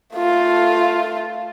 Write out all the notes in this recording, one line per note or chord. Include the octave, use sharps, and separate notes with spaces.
A3 F4